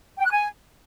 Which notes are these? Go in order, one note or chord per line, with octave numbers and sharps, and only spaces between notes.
G5
F#6
G#5